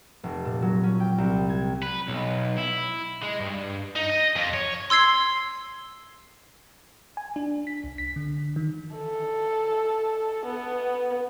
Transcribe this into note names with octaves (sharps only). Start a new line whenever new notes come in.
F1
A#2
F#3
C#4
G5
C2
G#6
B4
B1
E4
G#3
G2
D#4
D#5
F2
C#5
C6 E6 G#6 C7
G#5
D4
B6
C2
B6
D3
D#3
A4
B3